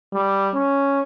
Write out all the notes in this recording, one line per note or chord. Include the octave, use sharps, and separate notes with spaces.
G3
C#4